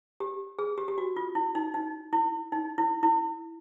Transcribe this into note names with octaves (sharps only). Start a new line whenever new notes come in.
G4
G#4
G4
G4
F#4
F4
E4
D#4
D#4
E4
D#4
E4
E4